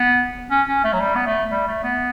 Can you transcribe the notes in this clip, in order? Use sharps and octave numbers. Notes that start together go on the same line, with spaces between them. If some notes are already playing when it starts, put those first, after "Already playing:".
Already playing: B3
C#4
C#4
A3
F#3
G3
B3
A3
G3
A3
B3